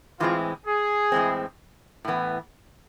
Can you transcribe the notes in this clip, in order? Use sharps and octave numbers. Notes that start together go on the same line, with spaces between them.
A2 E3 G#3 C4 F4
G#4
A2 E3 G#3 C4
A2 E3 B3